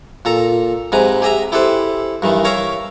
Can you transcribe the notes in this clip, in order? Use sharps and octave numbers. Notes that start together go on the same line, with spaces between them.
A#2 A4 A#5
G#2 C3 B4 G#5 A#5
G4 G#4 D#5 E5 A#5
E4 G4 A4 B4 C5
G2 D#3 E3
A#4 C#5 E5 F5 A#5